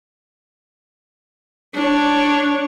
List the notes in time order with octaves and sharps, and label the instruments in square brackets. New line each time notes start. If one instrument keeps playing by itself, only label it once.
[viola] D4 C#5